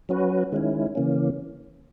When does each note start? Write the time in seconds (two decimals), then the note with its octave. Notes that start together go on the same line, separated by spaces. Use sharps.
0.09 F#3 C#4 F#4 B4
0.52 D#3 G#3 C#4 E4
0.95 C#3 E3 A#3 C#4